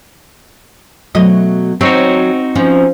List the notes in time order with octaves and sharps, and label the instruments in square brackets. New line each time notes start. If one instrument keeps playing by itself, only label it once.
[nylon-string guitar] B2 F#3 A3 [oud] D#5
[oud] F#3 [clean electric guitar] C4 D#4 F#4 [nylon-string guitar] C5 C#5
[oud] F3 [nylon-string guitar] C#4